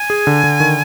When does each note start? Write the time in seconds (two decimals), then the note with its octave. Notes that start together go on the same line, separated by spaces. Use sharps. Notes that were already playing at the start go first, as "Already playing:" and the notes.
Already playing: G#5
0.10 G#4
0.27 D3
0.44 D3
0.60 D#3